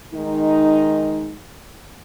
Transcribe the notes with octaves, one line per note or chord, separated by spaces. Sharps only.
D#3 G#3 D#4